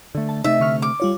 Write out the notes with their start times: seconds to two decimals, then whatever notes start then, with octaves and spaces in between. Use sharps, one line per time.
0.15 D3 A3
0.29 A5
0.44 C3 A3 D#4 D#5 E5
0.60 D3 C#6 F6
0.82 D6
1.00 G3 F4 C#5